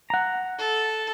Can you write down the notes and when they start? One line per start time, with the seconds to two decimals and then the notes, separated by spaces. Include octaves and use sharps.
0.10 F#5 A#5
0.59 A4